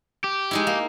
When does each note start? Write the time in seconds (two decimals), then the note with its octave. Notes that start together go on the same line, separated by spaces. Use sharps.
0.24 G4
0.51 G#3 D#4 E4
0.67 A#3